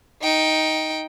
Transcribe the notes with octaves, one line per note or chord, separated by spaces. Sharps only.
D#4 G5